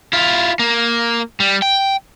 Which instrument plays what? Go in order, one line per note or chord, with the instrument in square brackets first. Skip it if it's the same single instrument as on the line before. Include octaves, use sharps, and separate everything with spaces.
[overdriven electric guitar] E4 F4
A#3
G3
G5